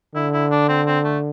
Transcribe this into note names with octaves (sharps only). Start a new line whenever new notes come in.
D3 E4
E4
D4
C4
C4
A3